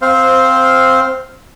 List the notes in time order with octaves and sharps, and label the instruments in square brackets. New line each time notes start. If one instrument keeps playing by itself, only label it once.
[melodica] C4 C5 F5